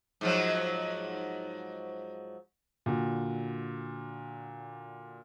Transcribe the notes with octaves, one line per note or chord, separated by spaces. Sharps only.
G#2 F3 F#3
A#2 D3 F#4